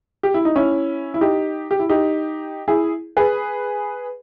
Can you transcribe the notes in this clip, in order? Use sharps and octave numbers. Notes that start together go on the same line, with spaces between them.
G4
E4
D#4
C#4 E4
E4
D#4 G4
G4
E4
D#4 G4
E4 G#4
G#4 B4